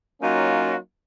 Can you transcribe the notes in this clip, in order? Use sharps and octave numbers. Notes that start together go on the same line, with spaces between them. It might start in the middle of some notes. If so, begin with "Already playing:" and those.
F#3 A#3 C#4 D#4 F4 F#4